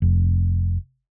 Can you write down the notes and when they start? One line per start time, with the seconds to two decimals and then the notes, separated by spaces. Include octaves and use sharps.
0.02 F1